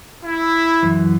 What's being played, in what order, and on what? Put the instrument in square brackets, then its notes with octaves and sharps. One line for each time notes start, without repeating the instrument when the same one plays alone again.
[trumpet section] E4
[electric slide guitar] F#2 E3